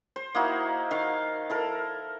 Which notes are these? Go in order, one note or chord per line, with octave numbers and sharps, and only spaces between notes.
C5
A#3 D#4 E4 F#4
D#3 F5
E4 A4 A#4